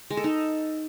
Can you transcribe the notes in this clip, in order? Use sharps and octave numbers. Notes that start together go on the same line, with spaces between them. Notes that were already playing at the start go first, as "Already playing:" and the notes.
G#3
A4
D#4